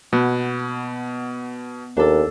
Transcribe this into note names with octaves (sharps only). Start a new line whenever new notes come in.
B2 B3
D#2 D4 A4